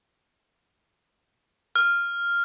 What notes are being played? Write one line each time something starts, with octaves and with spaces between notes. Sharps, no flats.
F6